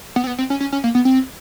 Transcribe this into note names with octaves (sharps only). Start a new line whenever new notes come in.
B3
C4
B3
C4
C#4
C#4
C#4
A#3
B3
C4